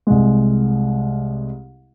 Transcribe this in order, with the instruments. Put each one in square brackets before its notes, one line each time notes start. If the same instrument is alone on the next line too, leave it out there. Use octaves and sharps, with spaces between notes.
[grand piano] C2 G#3